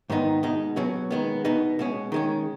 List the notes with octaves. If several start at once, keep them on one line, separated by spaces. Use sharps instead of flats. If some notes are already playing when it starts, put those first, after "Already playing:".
G#2 D#3 B3 D#4
B2 G#3 D#4
B2 F#3 C#4
D#3 G#3 B3
B2 B3 D#4
B2 G#3 C#4
D#3 G#3 C#4